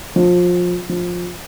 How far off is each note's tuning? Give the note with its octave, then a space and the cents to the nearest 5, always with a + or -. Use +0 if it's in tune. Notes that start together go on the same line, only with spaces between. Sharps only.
F3 +25
F3 +15